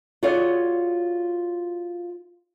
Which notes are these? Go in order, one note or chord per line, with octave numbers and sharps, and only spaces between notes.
F4 F#4 G#4 C#5 D5 F5